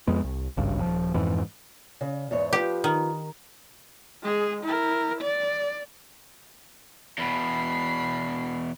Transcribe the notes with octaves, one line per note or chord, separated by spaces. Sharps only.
F2 G#3 B3
C2
G#1 C#2 G2
D#1 F3
F2 G#2 E3
C#3
E2 G#2 C#5
F3 G4 B4
D#3
G#3 G#4
E4 A#4
D5
E2 B2 B5 C7